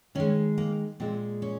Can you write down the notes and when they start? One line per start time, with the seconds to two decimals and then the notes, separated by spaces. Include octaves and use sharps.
0.15 D#3 G#3 C#4
0.58 A#3
1.00 A#2 G#3 C4
1.42 C#4